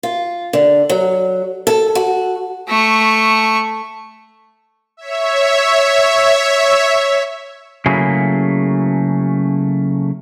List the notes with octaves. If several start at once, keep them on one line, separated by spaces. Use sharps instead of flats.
F4
D3
F#3
A4
F#4
A3 C#6
C#5 E5
C#3 F#3 A3 A#3 E4 G#4